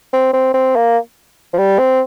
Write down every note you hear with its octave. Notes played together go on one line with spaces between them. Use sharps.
C4
C4
C4
A#3
F3
G3
C4